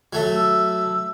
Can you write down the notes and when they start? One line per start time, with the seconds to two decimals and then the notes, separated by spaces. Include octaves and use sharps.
0.13 F#3 A3
0.35 E6